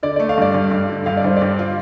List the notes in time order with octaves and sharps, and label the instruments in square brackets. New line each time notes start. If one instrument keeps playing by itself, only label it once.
[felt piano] D3 [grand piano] D5
[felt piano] A3 [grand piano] D5
[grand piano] F5
[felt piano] G2 [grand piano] D5
[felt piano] G2
G2
D3
[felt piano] G2 [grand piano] F5
[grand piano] D5
[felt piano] G2 [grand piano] C5
[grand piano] D5
[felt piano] G2
F4